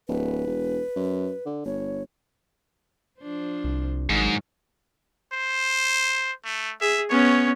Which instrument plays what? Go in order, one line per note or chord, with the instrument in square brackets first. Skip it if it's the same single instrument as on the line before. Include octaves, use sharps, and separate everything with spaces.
[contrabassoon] D1 [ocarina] B4
[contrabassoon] E1
F#2
D3
[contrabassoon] G1 [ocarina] C#5
[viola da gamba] F3 D4 C5
[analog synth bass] C2
[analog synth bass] G#1 [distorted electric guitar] G#2 [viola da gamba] D#3 F#3
[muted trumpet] C5
A3
[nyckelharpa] G#4 [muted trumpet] E5
[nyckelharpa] B3 C#4 [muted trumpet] C#5